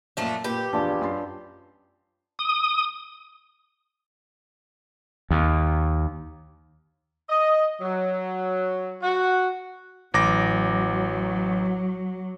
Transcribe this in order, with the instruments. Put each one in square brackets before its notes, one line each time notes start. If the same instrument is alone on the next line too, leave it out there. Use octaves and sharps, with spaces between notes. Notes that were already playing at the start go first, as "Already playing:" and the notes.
[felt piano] F#2 A#2 [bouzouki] F3 A3 D4
[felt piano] A#2 [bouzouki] G4 [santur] B4
[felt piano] A#1 E2 [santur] D4 F4
[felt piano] F#2 A5 C6
[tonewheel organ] D#6
[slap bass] D#2
[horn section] D#5
F#3
F#4
[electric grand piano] A1 D6 A#6 [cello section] F#3